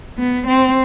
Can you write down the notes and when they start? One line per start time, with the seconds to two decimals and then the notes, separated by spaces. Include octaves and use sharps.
0.18 B3
0.47 C4